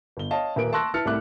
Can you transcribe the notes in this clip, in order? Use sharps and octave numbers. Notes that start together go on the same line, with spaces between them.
G1 G7
C#5 D#5 F5 A5
D#1 A#3 B4 D7
A5 C6 C#6 E6 F#6 A#6
E4 B4 A5 F6 A6 C#7
C2 A2 C3 E5 D6 F#6